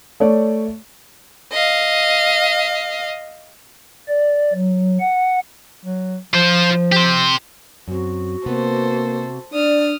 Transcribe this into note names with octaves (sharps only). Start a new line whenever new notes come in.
A3 C#5 D5
D#5 F5
D5
F#3
F#5
F#3
F3 F4 C5
G4 C5
F#2 C4 F#4
C3 A#3 B3 A4 B4 C5
D4 D5 D#6 F6